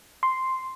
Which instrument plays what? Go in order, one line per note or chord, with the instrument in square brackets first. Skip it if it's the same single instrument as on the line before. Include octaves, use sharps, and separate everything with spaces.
[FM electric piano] C6